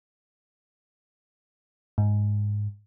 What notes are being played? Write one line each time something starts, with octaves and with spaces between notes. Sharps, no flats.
G#2